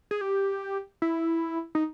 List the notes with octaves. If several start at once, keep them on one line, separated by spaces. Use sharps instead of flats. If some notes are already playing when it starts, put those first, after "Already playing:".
G#4
G4
E4
D#4